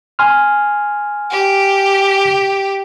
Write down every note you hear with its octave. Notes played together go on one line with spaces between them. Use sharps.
G#5 C6 F6
G4